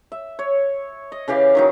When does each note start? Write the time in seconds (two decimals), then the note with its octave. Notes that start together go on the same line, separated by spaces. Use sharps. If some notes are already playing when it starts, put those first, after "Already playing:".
0.12 E5
0.39 C#5
1.12 D#5
1.28 C#3 E3 G4 F5
1.55 D#3 F#3 D#4